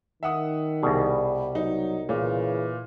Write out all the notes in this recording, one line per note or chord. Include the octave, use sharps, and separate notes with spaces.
D#3 E5 F#5 D#6
C2 B2 G3 G#4
F#3 D#4
A#2 C#3 E3